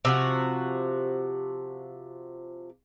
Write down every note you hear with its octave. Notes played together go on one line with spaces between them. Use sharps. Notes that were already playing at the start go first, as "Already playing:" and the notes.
C3 F3 F#4